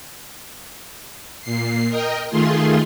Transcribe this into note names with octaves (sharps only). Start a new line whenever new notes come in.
A#2 C7
A#4 D#5 G5
D#3 A3 F4 G#4 C6